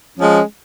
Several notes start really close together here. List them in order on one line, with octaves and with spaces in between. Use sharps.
C#4 F3 G#3